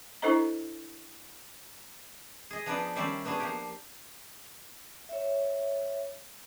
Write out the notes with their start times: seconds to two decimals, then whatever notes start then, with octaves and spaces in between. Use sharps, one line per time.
0.22 D4 E4 A4 C5 D#5 A#5
2.51 G#4 D#5
2.66 F3 B3 D4 D#4 B4 D5
2.96 D#3 G3 C#4 C5 D5 E5
3.25 B3 D4 F#4 G#4
3.40 F3 A#3 G4
5.09 C#5 E5